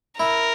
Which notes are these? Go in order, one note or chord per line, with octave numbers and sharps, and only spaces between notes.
E4 A#4